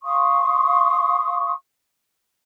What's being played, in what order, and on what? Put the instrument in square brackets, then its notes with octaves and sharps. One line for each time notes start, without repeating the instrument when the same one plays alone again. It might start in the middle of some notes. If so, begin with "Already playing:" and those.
[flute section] F5 C6 C#6 D#6